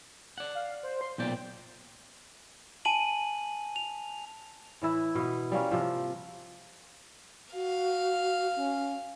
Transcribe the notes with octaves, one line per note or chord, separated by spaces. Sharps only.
D5 F#5
F5
C5
C6
B1 A#2 D5 G5
G#5 A5 D#7 F#7
F7
A2 E3 E4
B2 B3
G3 A#3 C#4
C3 F3
F#4 F5
C#4